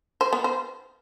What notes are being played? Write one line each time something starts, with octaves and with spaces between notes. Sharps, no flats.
C5
B3
C5